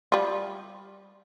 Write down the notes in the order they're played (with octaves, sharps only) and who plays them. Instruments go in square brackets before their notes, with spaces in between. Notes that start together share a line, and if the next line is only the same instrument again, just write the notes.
[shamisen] G3 F4